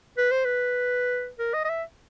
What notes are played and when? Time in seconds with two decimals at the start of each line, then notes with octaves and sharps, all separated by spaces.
0.18 B4
0.31 C5
0.45 B4
1.39 A#4
1.54 D#5
1.65 D#5
1.70 E5